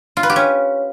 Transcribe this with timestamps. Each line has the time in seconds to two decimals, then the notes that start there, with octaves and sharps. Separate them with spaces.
0.17 F4
0.23 B4
0.30 G4
0.36 C#4